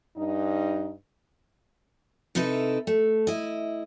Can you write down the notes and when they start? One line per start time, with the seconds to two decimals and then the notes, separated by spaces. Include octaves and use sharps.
0.17 G2 D#4
2.35 C3 D#4 E4 A4 B4
2.87 A3
3.27 E4 D#5